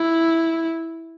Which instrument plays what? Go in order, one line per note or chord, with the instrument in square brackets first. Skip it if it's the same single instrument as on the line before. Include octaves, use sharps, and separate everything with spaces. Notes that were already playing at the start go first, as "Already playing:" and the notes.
Already playing: [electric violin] E4